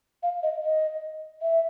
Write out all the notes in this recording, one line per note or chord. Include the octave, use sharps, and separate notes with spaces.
F5
D#5
D#5
E5